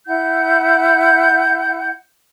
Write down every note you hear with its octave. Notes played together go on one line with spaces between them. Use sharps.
E4 F#5 G6